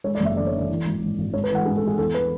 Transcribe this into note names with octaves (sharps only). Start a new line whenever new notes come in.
G#3 C#5
D5
F#1 E5
D3 D5
C#5
D3
D5
E3
G#1
G#1
G#1
G#2 C#5
B4
E3
F#5
G#2 G#4
A4
G#3 G#4
E2 A4
B4